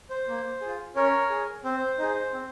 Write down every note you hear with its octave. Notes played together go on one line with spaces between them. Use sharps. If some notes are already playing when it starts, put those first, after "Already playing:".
C5
A#3
F4 G#4
C#4 A#4 C#5
G#4
C4 C5
D#4 G#4
C4